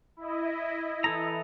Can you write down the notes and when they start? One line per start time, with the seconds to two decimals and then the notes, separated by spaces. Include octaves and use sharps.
0.17 E4 D#5
1.04 E3 A4 A#5